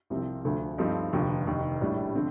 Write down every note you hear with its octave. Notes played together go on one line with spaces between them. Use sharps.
C2 C3 F3 C4
D2 D3 F3 A3
G2 F3 A3 C4 D#4
F1 D#2 D3 F3
F1 D#2 D#3
A#1 A2 G3 D4
D3 F3 C4